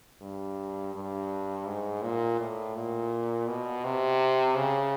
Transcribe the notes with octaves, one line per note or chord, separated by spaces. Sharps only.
G2
G2
G#2
A#2
A2
A#2
B2
C3
C#3